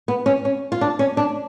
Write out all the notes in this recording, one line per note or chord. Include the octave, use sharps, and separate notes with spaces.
B3
C#4
C#4
F4
D4
C#4
D4